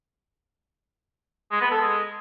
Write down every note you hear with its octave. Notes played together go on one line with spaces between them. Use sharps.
G#3
B3
A4
G#3